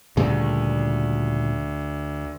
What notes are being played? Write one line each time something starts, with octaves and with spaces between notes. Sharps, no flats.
D2 A#2 C#3 G3